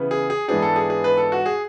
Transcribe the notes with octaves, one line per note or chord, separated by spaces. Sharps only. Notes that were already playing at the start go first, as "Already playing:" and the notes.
Already playing: C#3 E3 B3
G#4
G#4
G#2 E3 B3 D4 G#4
A4
G#4
G#4
B4
A4
F#4
G#4